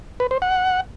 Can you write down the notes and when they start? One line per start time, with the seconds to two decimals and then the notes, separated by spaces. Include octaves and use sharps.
0.20 B4
0.31 C5
0.42 F#5